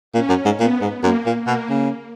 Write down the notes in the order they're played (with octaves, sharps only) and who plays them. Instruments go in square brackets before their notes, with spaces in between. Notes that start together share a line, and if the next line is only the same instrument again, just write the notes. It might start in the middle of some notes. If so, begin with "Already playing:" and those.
[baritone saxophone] A#2 [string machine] C#4
[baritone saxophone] F#2
G#2
[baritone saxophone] A#2 [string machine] B3
[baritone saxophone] G#2
[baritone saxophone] F#2 [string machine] A#3
[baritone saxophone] A#2
[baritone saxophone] B2 [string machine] A#3
[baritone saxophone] C#3